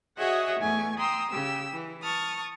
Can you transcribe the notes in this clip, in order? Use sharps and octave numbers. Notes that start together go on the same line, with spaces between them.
F#4 G#4 C#5 D#5 E5 F#5
E2 A3 G#5 C#6
G5 A#5 C6 D#6 E6
C#3 G4 E6
E3
A5 C#6 D#6 F6